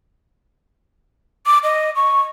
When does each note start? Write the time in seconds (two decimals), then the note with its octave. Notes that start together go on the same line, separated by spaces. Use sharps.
1.46 D6
1.63 D#5
1.96 C#6